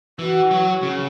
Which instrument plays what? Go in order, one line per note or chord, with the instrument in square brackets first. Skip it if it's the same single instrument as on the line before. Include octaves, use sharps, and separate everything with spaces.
[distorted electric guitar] E3 [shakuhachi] F#4
[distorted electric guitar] F#3
C#3